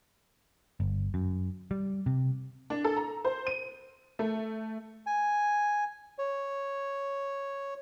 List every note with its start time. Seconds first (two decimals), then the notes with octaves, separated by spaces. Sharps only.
0.80 G1
1.14 F#2
1.71 G3
2.06 C3
2.70 D4
2.84 A4
2.97 A#5
3.25 C5
3.47 D#7
4.19 A3
5.06 G#5
6.18 C#5